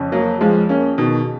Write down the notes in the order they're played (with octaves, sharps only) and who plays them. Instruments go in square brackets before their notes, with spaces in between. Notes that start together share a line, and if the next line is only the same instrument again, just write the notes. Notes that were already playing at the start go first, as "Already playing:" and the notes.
Already playing: [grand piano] F2 C#3 C#4
[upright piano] F#3 A#3
F3 G#3
A#3 C#4
B2 D#3